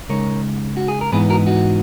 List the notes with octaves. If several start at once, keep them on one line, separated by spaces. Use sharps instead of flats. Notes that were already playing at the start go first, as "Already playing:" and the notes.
C#3 G#3 D#4 A#4 C#5
F#4
G#4
A#4
G#2 E3 B3 D#4 G#4 B4
F#4 A#4
D#4 F#4